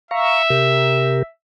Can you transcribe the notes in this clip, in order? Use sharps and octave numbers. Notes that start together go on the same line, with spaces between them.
E5 F5 A#5 C#6
C3 G4 A#4